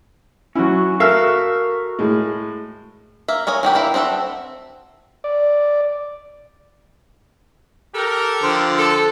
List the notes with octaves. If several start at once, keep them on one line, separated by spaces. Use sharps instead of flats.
F#3 C#4 E4 F#4
F#4 A4 A#4 E5 F5
A2 G#3
A#3 E5
A#3 C#5 D#5 G#5
D#3 F#3 G4 B4
A#3 E4 E5
C4 D#4 F#4 A4 E5
D5
G4 A4 A#4
D3 F3 C5
A4